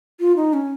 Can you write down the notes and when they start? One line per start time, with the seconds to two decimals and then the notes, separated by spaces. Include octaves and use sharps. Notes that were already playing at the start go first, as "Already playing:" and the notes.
0.20 F4
0.36 D#4
0.53 C#4